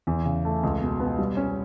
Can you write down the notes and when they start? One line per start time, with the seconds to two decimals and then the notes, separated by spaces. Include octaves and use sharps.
0.07 E2
0.25 C#3
0.45 A3
0.63 C#2
0.81 B2
1.00 B3
1.19 G3
1.37 C#4